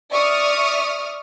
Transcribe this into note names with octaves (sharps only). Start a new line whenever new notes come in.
D5 E5 C#6 D#6 F6